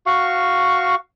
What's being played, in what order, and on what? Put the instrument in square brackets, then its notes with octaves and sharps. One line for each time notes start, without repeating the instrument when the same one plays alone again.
[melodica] F#4 F5 C#6